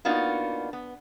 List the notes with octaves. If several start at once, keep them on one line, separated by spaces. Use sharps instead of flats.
A#3 B3 D4 D#4 F4 F#4
B3